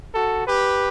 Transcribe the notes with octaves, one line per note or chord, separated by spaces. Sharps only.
F#4 A4
G4 B4